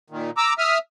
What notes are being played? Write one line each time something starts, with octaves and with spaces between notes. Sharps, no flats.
A#2 D#3
A#5 D6 E6
E5 D#6 F6